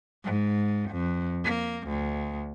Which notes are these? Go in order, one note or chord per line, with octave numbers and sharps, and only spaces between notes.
G#2
F2
A#3
D2